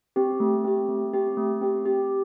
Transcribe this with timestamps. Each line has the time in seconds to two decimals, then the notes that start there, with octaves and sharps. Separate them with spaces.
0.16 C4 G4
0.40 A3
0.64 C4 G4
0.89 A3
1.13 C4 G4
1.37 A3
1.61 C4 G4
1.86 G4